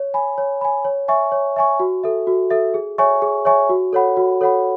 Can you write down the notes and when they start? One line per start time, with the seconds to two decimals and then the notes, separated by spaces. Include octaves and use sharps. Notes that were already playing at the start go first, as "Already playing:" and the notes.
Already playing: C#5
0.14 G#5 B5
0.38 C#5
0.61 G#5 B5
0.85 C#5
1.08 E5 G#5 C#6
1.32 C#5
1.56 E5 G#5 C#6
1.80 F#4
2.03 A4 E5
2.27 F#4
2.50 A4 E5
2.74 G#4
2.98 C#5 E5 G#5 C#6
3.22 G#4
3.45 C#5 E5 G#5 C#6
3.69 F#4
3.93 A4 C#5 F#5 B5
4.17 F#4
4.41 A4 C#5 F#5 B5